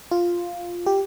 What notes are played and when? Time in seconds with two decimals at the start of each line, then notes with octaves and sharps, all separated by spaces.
0.11 F4
0.86 G4